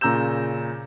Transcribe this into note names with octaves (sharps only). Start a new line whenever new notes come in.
A#2 C#3 A#5 E6 G6 E7